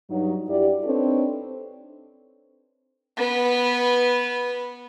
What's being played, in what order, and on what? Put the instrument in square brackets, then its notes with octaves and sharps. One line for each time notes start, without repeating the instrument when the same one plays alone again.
[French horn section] G2 F#3 D#4
G2 E4 F#4 G4 D5
C4 D4 D#4 A4 B4 C#5
[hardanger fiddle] B3 B4